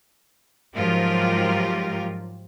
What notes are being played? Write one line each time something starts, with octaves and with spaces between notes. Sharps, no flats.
G#2 F3 F#3 F4 G4 A#4